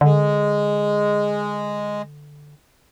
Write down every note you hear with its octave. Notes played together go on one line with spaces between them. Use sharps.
D3 G#3